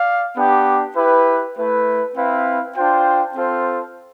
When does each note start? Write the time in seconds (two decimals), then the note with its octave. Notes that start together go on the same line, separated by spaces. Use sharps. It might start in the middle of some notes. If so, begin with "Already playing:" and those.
Already playing: D5 F5
0.37 B3 D4 G4
0.96 E4 G4 B4
1.56 A3 E4 B4
2.15 C4 E4 B4 F5
2.75 D4 F4 C5 G5
3.35 C4 F4 A4 C5